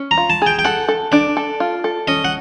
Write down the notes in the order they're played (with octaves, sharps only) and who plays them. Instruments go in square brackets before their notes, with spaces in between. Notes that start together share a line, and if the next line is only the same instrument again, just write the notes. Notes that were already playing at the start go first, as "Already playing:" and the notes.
Already playing: [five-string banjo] C#4
[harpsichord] A#5
[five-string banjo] F4
[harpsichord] A5
[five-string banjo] G#4 [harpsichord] G5
[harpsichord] G5
[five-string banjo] A4 [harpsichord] F#5
[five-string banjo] A4
[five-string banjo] D4 [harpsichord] D5
[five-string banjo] A4
F4
A4
[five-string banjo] C#4 [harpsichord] D#5
[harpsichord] F#5